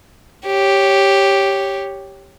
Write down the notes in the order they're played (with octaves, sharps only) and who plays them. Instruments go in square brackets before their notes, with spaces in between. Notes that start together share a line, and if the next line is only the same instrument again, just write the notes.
[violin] G4 C#5